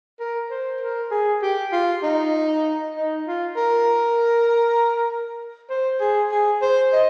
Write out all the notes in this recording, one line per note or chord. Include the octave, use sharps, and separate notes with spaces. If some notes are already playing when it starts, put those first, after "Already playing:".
A#4
C5
A#4
G#4
G4
F4
D#4
D#4
F4
A#4
C5
G#4
G#4
C5
D#5